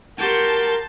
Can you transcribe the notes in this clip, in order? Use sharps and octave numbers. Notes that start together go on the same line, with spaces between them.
F#4 G4 A#4 A5 C6